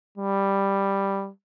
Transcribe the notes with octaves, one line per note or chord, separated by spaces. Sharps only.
G3